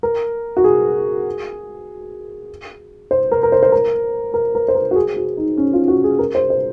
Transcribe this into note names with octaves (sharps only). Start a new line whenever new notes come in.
A#4
F#4
G#4
C5
A#4
A#4
C5
C5
A#4
A#4
A#4
C5
A#4
F#4
G#4
F#4
D#4
C#4
F4
F#4
G#4
A#4
C5
C5